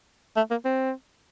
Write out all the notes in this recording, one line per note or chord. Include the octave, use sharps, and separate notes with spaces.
A3
A#3
C4